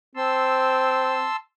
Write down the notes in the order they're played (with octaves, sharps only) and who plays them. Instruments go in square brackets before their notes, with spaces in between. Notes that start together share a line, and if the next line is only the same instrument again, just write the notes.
[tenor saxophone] C4 [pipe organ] A5 C6 E6